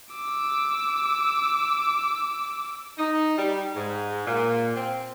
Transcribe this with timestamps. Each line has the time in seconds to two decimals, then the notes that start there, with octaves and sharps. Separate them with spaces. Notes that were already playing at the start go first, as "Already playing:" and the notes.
0.12 D6 E6
2.98 D#4
3.37 G3
3.76 G#2
4.26 A#2
4.75 C4